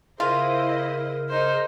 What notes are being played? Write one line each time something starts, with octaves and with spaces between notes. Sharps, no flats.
C#3 E4 F4 A#4 C5 D#5
D#4 C5